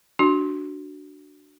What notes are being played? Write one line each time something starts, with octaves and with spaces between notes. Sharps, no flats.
D4 F#4